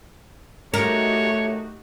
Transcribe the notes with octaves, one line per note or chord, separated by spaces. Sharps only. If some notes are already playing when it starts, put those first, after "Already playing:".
A3 D#4 F#4 G4 A#4 C#5